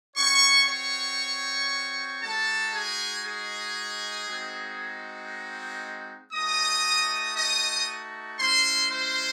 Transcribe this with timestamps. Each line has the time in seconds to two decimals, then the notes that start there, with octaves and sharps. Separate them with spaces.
0.16 C4 F#4 C#5 C#6
0.68 C#5 C#6
2.22 G#3 D#4 F#4 A4 A5
2.74 G#4 G#5
3.25 G#4 G#5
4.28 G#3 C4 D#4 F#4
6.33 A3 D#4 F#4 D#5 D#6
7.36 D#5 D#6
8.39 G#3 C#4 E4 C5 C6
8.91 C5 C6